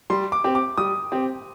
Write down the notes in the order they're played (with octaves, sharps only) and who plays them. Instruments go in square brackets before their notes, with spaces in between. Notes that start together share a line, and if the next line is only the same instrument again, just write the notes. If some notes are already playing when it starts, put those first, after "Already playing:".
[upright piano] G3 [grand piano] C6
[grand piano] D6
[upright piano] C4 G4
[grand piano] D6
[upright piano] G3 [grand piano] D#6
[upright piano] C4 G4